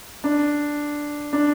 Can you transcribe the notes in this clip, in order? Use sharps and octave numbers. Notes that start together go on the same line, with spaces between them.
D4
D4